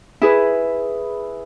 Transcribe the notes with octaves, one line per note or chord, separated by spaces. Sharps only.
E4 G#4 B4